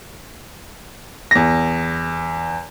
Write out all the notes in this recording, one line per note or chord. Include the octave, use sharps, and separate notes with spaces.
E2 A#6